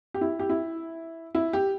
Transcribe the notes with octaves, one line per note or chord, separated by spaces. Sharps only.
G4
E4
G4
E4
E4
G4